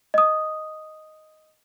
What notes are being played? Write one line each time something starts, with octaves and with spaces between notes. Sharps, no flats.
D#5 D#6